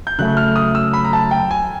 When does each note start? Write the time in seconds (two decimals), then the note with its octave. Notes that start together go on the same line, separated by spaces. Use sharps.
0.07 G6
0.19 C#3 F#3 A3 F#6
0.37 F6
0.56 D#6
0.75 E6
0.93 B5
1.05 A#5
1.13 A5
1.31 G5
1.51 G#5